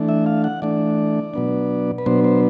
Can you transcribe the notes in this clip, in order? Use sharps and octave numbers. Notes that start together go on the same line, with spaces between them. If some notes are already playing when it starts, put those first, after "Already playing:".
Already playing: E3 A3 D4
E5
F5
F#5
E3 A3 D4 D5
B2 F#3 B3 D4
B4
B2 F#3 B3 D4 C5
C5